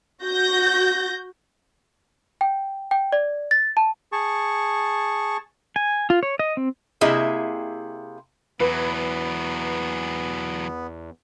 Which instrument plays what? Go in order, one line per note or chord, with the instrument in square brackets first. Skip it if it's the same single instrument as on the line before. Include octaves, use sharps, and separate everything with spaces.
[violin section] F#4 G6 A#6
[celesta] G5
G5
D5
A6
A5
[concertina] G#4 A5 C#6
[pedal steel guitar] G#5
F4
C#5
D#5
C4
[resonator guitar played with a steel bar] C3 A#3 E4 G#4 D#5 E5
[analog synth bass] E2 [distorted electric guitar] E3 F#3 [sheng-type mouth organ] B3 [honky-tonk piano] B4